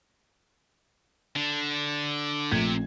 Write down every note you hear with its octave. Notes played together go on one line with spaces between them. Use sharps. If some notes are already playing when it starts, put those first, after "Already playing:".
D3 D4
A#1 C3 A3 G#6